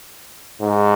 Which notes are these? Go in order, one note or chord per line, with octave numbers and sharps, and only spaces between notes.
G#2